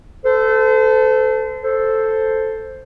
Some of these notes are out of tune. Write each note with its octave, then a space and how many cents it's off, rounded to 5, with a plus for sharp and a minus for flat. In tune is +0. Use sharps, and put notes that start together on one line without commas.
A4 +0 C5 -35
A4 +0 C5 +0